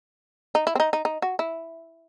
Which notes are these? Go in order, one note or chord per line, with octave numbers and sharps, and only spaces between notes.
D#4
E4
C4
D#4
D#4
D#4
F#4
E4